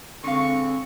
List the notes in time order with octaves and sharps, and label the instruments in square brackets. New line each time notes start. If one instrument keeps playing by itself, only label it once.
[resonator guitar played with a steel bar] D3 G#3 F5 [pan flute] C4 [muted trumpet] C#6